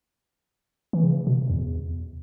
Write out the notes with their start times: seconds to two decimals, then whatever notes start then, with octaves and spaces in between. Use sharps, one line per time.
0.93 E3
1.03 C#3
1.27 B2
1.50 E2